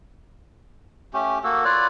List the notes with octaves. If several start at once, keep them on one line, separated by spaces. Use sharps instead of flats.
A3 C#4 G4
A#3 F#4 A4
F4 B4 C#5 D5